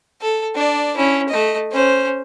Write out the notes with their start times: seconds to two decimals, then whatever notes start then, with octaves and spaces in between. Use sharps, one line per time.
0.22 A4
0.55 D4 D5
0.97 C#4 E4
1.29 A3 D#5
1.72 C#4 C5